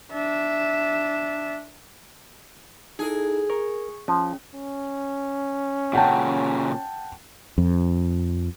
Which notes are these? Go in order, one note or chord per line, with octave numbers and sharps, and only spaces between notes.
D4 E5
D#4 E4 G#4 A4
A#4 C#6
F3 C#4
C#4
A#2 C#3 F#5 G5 A5
F2